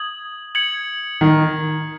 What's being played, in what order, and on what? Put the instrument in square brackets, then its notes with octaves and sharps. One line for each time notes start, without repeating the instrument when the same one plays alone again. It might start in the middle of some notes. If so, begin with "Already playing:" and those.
Already playing: [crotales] D#6 G#6 F#7
G#6 C#7 F#7
[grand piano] D#3